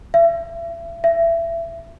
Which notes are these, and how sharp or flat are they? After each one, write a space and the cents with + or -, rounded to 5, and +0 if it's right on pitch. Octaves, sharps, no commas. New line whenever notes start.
E5 +35
E5 +25